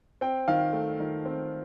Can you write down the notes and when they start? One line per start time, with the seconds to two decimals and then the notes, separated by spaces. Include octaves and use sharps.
0.21 C4 G5
0.48 D#3 F5
0.73 A3
1.00 D#3
1.25 C4